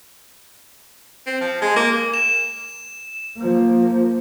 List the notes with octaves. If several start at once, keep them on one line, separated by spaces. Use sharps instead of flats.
C4
F3
G#3
A#3
E7
F3 A#3